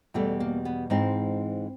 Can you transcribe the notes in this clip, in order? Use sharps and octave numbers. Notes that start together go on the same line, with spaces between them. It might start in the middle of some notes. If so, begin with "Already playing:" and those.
E2 B2 G3 A3
A#3
B3
G#2 E3 G#3 C4